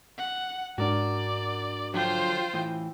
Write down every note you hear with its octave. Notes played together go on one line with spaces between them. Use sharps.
F#5
G#2 D4 F#4 A#4 D5
D3 F3 F#3 F4 C5 G5
A2 E3